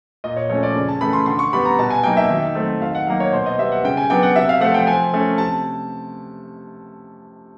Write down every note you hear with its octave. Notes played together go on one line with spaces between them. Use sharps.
A#2 D#5
C#5
F3 A3 C#4 C#5
D5
C#3
A5
E3 A3 C#4 B5
C6
D3 C6
C#6
G3 B3 D4 B5
A#5
B2 A5
G#5
F#3 A#3 D#4 G5
E5
D#3
F#3 A3 C4
D#3 F5
F#5
F#3 A#3 D#4 F5
C#5
B2 C5
D#5
G3 B3 E5
F#5
C#3 G5
G#5
F#3 B3 D4 G5
F#5
C3 E5
F5
F3 A3 F#5
G5
F3 G#5
A3 C#4
C3 A5